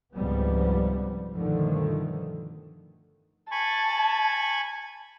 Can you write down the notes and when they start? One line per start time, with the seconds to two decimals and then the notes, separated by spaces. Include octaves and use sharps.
0.15 C#2 G#2 C3 F3 G3 B3
1.33 G2 B2 D3 D#3 F3 A3
3.51 G#5 A5 B5 C#6